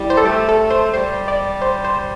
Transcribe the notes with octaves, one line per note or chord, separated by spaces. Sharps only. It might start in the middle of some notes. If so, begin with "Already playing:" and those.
Already playing: G3 E4
C5
A4
A3 G4
A4
C5
G3 C5
D5
C5
C5